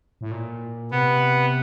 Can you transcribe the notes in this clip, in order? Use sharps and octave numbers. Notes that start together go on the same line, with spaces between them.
A2
A#2
C3 B3